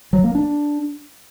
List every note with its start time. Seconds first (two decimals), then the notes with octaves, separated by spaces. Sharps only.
0.13 F#3
0.24 A#3
0.35 D4